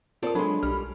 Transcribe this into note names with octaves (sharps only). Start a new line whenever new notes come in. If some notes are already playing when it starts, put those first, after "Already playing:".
C4 F4 A4 A#4 D5 D#6
F#3 G#3 D4 A4 B5 C6
B1 G3 F6